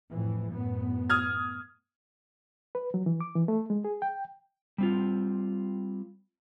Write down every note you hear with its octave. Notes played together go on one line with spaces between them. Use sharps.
F2 A2 E3
F#2 A2 B3
D#6 F6 G#6
B4
F#3
E3
D6
E3
A3
G#3
G#4
G5
G3 C4 F4